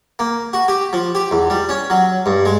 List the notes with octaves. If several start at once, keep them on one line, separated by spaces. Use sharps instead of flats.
A#3
F#4
G4
F3
G4
E2
G3
C#4
F#3
G2
G#3